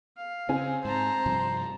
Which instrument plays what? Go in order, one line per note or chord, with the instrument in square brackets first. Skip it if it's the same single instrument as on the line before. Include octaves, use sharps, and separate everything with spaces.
[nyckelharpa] F5
[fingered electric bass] C#3 [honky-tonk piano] C4 G#5
[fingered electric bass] G#2 [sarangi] C5 [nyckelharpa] A5 A#5
[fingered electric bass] G2 C3 F3